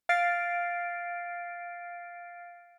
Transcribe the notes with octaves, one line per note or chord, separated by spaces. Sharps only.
F5 F6 A6 C7 D7